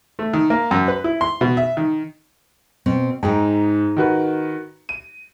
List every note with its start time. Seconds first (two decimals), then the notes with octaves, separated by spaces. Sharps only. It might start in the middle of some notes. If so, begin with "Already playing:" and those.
0.19 A3
0.34 D#3
0.50 A#3
0.71 F#2
0.88 B4
1.04 E4
1.21 C6
1.41 B2
1.57 E5
1.77 D#3
2.86 B2 C4
3.23 G#2 D#4 G#4 G5
3.97 D#3 F#4 B4
4.89 D#7